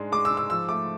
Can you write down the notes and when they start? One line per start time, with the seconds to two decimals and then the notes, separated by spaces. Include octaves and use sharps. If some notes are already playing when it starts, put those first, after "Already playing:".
Already playing: G#2 G#3 D4
0.12 G#3 D6
0.25 E6
0.31 G#2
0.37 E6
0.50 F3 E6
0.69 A3 D6